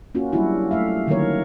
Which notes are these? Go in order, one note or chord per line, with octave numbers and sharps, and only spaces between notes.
A#3 C#4 F4 F#4
F#3 G3 A#3 D4 E4 F#4
A3 E5 F5
D3 D#3 F#3 A#3 A#4 C#5